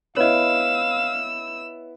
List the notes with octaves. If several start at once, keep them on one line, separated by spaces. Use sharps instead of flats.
B3 E4 C#5 D#5 F5 E6